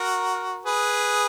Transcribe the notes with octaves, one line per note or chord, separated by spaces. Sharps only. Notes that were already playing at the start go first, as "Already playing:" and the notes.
Already playing: F#4 A#4
G#4 B4